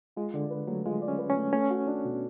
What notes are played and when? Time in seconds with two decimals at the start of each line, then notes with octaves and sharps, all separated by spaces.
0.16 G#3 F4
0.34 D3 D5
0.50 B4
0.68 F#3 A3
0.85 G#3 F4
1.02 D5
1.08 C#4
1.18 B4
1.30 C#4
1.36 A3
1.53 A3 C#4
1.70 F#4
1.87 D4
2.04 B2